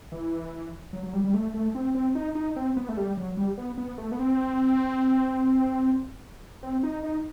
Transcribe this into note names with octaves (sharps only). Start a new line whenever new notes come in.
E3
F#3
F#3
G3
G3
A3
A3
C4
C4
D#4
D#4
C4
B3
A3
G3
F#3
G3
B3
B3
A3
B3
C4
C4
D#4
D#4